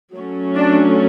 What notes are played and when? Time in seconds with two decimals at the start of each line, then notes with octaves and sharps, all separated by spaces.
0.15 F#3 A3 C#4
0.56 D4